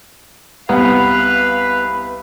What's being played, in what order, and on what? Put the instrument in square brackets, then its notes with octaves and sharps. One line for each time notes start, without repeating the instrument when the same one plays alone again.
[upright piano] C2 F#5 [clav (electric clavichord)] B3 [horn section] B4 [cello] F5